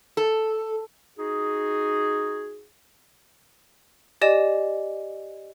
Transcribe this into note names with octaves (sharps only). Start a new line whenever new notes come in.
A4
D#4 F#4 G#4
G4 D5 D#5 G#5 E7